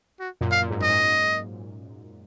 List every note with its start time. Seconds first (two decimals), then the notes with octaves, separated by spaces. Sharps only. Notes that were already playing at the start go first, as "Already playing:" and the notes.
0.20 F#4
0.41 F#2 A#2
0.52 F5
0.62 A#2
0.70 G#2
0.80 F#2 D#5
0.89 G#2